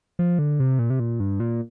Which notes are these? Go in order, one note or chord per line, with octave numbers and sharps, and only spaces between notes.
F3
D3
C3
A#2
C3
A#2
G2
A#2